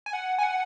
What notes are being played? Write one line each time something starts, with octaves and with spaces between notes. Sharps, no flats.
G#5
F#5
G#5
F#5